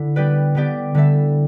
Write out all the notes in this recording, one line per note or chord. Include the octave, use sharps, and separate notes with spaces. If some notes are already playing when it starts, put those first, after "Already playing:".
Already playing: D3 E4
G3 B3 G4 B4 D5
D3 B3 G4 D5
D3 G3 E4 A4 E5